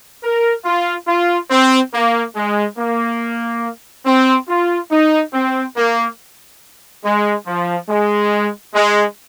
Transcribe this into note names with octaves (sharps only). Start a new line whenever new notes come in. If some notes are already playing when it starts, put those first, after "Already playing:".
A#4
F4
F4
C4
A#3
G#3
A#3
C4
F4
D#4
C4
A#3
G#3
F3
G#3
G#3